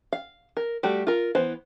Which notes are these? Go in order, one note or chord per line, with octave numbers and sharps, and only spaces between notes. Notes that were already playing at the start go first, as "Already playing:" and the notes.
F5
A#4
G3 A3 F#4 G4
F4 A#4
E3 B3 C5